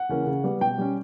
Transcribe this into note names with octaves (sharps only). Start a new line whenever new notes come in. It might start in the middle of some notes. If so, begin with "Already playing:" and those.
Already playing: F#5
C#3 E3 A#3 C#4
C#3
G3 B3
B2 G5
G3 C#4